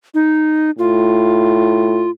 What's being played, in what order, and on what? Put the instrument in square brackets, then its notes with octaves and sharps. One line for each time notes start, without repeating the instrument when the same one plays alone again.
[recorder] D#4
[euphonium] A2 [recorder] F4